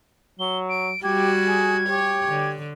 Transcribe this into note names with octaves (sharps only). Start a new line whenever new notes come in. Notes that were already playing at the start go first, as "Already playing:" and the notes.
F#3 G7
D7
G3 F#4 G4 G#6
G#4
G4 C#5
D3